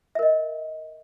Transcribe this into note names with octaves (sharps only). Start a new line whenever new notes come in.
A#4 D#5 E5